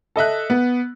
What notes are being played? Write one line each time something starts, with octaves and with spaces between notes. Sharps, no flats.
A4 D#5 E5 F#6
B3